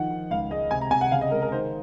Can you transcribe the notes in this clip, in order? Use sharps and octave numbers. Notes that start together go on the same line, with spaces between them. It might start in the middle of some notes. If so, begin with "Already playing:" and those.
Already playing: D#3 F3 F#5
D#3
C#2 F5
G#3 D#5
C3 G#5
A#5
C3 G#5
F#5
C#3 F5
D#5
G#3 A#4
A#4
D#3 C5